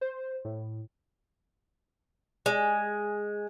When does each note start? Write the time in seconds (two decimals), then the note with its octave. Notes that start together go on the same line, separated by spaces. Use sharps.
0.01 C5
0.45 A2
2.46 G#3